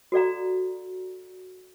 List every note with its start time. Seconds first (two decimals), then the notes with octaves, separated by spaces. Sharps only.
0.12 F#4 A4 D5 F5 A#5